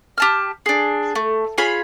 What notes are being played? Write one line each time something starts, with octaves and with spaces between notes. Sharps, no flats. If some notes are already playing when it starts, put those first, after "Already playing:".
G4 A5 F6
D4 G#4
A3
F4 G#4 C#5 B5